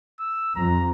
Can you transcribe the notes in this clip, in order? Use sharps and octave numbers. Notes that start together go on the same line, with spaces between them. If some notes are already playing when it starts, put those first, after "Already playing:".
E6
F2 A#5